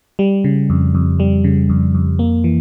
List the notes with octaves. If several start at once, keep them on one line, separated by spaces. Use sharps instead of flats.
G3
C#3
F2
F2
G3
C#3
F2
F2
A#3
E3